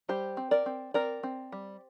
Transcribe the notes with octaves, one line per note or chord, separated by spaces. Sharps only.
G3 G4 C5
C4
A#4 D5
C4
C4 A#4 D5
C4
G3